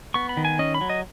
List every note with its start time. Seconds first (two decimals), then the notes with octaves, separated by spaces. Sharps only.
0.14 B3 C#6
0.29 B5
0.37 D#3
0.45 G#5
0.59 C#4 D#5
0.74 B5
0.81 F#3
0.90 D#5